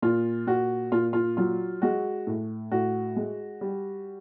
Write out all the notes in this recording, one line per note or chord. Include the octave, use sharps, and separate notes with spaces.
A#2 F4
A#2 F#4
A#2 F4
F4
F#3 F4
G#3 F#4
A2
A2 F#4
G#3
G3